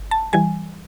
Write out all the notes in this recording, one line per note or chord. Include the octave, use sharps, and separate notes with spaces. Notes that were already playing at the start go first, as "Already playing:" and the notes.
Already playing: G1
A5
E3 G3 G#5